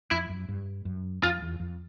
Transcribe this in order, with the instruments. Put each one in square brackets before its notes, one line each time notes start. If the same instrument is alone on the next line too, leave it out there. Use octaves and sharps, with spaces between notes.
[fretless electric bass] F2 [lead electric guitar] E4
[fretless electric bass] F#2
G2
F#2
[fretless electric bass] F2 [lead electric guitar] F4
[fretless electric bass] E2
F2